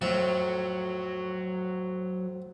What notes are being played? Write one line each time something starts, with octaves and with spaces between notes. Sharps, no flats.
F2 A2 F#3 E5